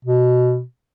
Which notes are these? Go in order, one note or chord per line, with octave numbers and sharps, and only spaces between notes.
B2